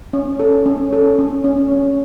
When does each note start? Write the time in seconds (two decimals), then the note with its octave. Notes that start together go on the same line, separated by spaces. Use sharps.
0.13 C#4
0.40 A4
0.66 C#4
0.93 A4
1.19 C#4
1.44 C#4
1.72 C#4